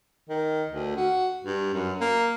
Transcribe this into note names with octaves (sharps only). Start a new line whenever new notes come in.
D#3
D2
F#4
G2
F#2
A#3